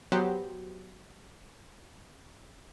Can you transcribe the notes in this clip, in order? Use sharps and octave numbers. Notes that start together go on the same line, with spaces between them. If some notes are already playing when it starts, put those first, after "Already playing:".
F#3 B3 F#4 G4 C5